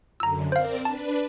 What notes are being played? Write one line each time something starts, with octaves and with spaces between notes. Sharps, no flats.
F#2 D3 A#5 E6
C4 A#4 C5 D5 F5
D4 B4 A5